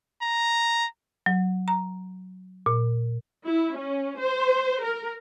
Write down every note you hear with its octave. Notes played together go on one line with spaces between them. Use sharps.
A#5
F#3
A#5
A#2
E4
C#4
C5
A#4